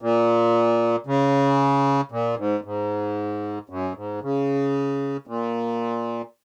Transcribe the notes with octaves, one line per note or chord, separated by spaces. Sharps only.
A#2
C#3
A#2
G#2
G#2
F#2
G#2
C#3
A#2